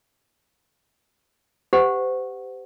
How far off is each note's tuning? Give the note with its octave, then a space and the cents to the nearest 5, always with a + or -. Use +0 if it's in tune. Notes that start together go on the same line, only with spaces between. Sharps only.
G4 +0 C5 -40 F#5 +0